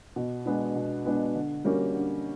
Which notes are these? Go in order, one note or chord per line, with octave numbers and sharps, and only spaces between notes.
B2
G#3 B3 D4
B2
G#3 B3 D4
D3
G3 A#3 C#4 F#4
D3